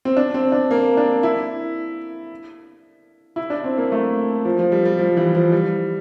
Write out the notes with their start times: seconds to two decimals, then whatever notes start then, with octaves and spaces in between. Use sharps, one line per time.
0.05 C4
0.17 D4
0.34 C4
0.52 D4
0.71 A#3
0.97 D4
1.23 E4
3.36 E4
3.50 D4
3.64 C4
3.78 A#3
3.92 A3
4.45 F3
4.59 F3
4.72 G3
4.85 G3
4.99 F3
5.17 E3
5.35 F3
5.52 G3